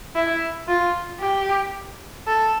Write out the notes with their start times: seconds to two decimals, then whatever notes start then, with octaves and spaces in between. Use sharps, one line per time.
0.15 E4
0.68 F4
1.21 G4
2.27 A4